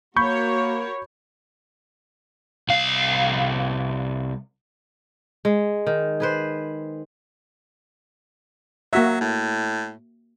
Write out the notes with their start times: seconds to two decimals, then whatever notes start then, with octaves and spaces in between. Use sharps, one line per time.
0.16 A#3 F#4 A#4 C#5 B5 C#6 G6
2.69 C2 F5
5.45 G#3
5.87 D#3
6.20 G#4 B4 C5
8.93 F#3 A#3 F#4 E5
9.21 A2